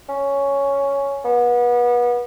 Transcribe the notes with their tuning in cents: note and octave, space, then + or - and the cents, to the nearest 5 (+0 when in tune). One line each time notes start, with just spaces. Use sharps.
C#4 +5
B3 -30